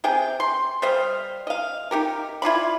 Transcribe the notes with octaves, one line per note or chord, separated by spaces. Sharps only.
C3 G#4 G5
C6
G3 C5 D#5 F5
D#5 F5
D#4 G4 A#4
E4 F4 D5 B5